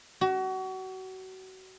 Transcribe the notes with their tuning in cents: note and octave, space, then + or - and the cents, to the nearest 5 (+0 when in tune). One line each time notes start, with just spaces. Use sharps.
F#4 +30